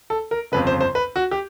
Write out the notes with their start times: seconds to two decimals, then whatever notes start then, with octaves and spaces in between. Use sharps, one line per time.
0.10 A4
0.31 A#4
0.52 G1 F2 C#3 B4
0.67 C5
0.81 C5
0.95 B4
1.16 F#4
1.31 G4